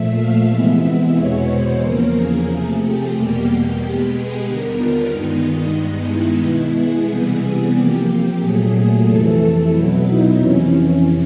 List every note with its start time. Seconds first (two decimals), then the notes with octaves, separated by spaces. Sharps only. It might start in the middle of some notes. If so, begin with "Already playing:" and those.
Already playing: A#2 F3 A3 E5
0.17 F5
0.49 C3 E3 G#3 B3 E5
0.82 E5
1.15 E2 B2 G#3 B3 C#5
1.48 C5
1.81 E2 C#3 F3 A#3 A#4
2.13 G#4
2.46 C3 F3 A3 G#4
2.79 G4
3.13 E2 B2 G3 A#3
3.78 B2 G#3 B3 G4
4.11 G#4
4.44 D#2 D3 G3 B3 A#4
4.78 F4
5.09 G2 D#3 G#3 B3 D#4
5.43 D#4
5.76 G2 D#3 G#3 B3 D#4
6.08 E4
6.41 B2 G#3 B3
6.74 G#4
7.07 C3 E3 G3 B3 G#4
7.40 G#4
7.72 C3 F3 A#3 G4
8.38 A#2 F#3 A3 G#4
9.04 F2 C3 E3 A3 A4
9.38 A4
9.70 B2 F#3 B3 E4
10.03 D#4
10.36 F2 C3 E3 C#4